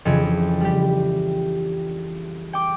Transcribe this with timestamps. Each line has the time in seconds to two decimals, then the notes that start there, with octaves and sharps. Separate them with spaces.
0.05 F2 C#3 E3
0.61 G3 G4
2.53 G5 D6